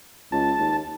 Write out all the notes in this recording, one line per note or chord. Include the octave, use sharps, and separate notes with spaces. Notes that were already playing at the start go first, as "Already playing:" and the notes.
C#2 A5
D#2